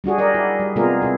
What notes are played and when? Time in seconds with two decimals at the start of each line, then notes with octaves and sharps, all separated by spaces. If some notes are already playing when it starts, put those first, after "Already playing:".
0.04 G3 D4 F#4 G#4
0.18 A#4 D5 D#5
0.35 E4
0.60 G3
0.76 C3 G#3 B3 F4 G#4 A#4
1.02 C3 E4